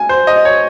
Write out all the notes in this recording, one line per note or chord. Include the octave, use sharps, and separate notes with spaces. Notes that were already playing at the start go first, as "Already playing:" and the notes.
Already playing: G#5
C5
D#5
C#5